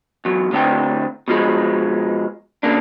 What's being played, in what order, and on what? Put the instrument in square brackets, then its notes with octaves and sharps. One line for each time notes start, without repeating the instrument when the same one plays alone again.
[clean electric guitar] E2 F#3
A2 D3 C4 D4 G5
B2 F3 G#3
C#3 A#3 D4